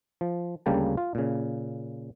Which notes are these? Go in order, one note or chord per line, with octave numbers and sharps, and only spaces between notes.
F3
D2 C#3 G3 A#3 G5 A5
F4
A#2 C#3